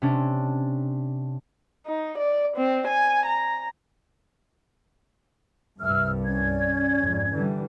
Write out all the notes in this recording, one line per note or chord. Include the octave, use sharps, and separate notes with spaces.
C3 C#4 D4
D#4
D5
C4
G#5
A#5
C2 G2 E5 E6 F6
C#4 D5 G#6
F2 G#2
D3 E3 G3